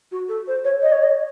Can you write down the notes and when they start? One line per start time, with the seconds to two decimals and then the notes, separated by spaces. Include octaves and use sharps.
0.11 F#4
0.28 A4
0.47 C5
0.64 C#5
0.82 D#5
0.92 C#5
1.03 D#5